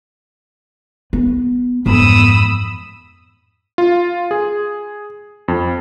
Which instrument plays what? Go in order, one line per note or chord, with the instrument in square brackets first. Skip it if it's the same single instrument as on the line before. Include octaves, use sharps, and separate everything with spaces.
[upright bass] B3
[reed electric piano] F2 G#2 [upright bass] E3 B3 [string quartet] B5 D#6 E6
[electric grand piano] F4
G#4
F2